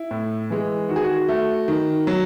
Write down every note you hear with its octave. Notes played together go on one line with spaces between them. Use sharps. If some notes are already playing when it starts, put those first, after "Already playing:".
Already playing: E4
A2
E3 G#3
D#3 F#4
G#4
F#4
A3
D#3
F#3